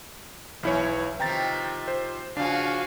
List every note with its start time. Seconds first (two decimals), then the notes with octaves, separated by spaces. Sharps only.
0.63 B1 E3 E4 C#5
1.20 C3 D#3 F3 G5 A#5 A6
1.88 C5
2.37 C#3 F3 D4 F#4 G#4 F5